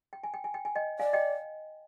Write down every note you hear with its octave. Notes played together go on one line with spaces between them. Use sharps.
G5
G#5
G5
G#5
G5
G#5
D#5 G5
D5 F5 G#5
D#5 G5